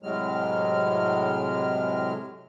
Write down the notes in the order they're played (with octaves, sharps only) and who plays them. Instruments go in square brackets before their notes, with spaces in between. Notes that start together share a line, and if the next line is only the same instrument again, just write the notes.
[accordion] A2 C3 F#3 G#3 F6